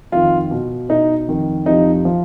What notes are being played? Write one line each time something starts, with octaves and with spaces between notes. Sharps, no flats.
F2 D#3 F4
B2
B2 D#4
F2 D#3
F2 C3 F3 D#4
F3